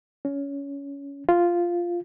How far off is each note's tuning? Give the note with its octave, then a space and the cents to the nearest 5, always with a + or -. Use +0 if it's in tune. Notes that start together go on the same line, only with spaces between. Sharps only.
C#4 +20
F4 -5